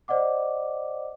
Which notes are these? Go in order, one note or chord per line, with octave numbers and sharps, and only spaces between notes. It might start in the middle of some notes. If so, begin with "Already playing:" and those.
C5 D5 D#5 F#5 D6